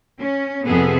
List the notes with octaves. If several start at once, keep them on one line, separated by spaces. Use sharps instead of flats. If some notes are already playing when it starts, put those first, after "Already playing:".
C#4
F2 C3 B3 G#4 A4